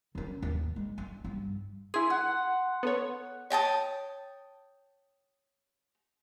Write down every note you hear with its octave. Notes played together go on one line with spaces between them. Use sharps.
D#3 C#4
D#2
G#3
D4
G2
E4 G#4 C6
F#5
B3 A4 C#5
C#5 G5 A5 D#6